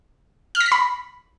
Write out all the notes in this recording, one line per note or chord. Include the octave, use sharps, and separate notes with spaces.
F6
A#6
B6
B5